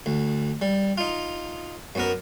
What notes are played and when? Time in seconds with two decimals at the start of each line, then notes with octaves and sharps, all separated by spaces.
0.06 D2
0.62 G3
0.98 D#4 F4
1.95 F#2 B3 A#4